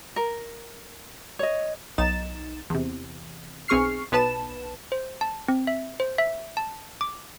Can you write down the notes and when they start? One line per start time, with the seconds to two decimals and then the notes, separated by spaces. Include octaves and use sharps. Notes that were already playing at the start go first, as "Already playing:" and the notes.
0.16 A#4
1.39 C#5 D#5
1.98 B1 D#4 A6 E7
2.70 E2 C3
3.68 B1 C4 G#4 C#6 F6 C7
4.12 B1 B3 B4 A5 E7
4.92 C5
5.21 A5
5.48 C4
5.67 E5
6.00 C5
6.18 E5
6.57 A5
7.01 D6